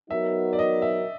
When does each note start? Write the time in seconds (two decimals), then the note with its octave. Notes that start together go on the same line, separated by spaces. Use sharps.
0.10 F#3 B3 D#4 F#4 A#4 E5
0.53 D5
0.59 D#5
0.82 E5